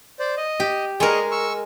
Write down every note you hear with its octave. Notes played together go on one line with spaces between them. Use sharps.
C5 D5
D#5
G4
G#3 G#4 A#4 D#5 C#6
C#6 E6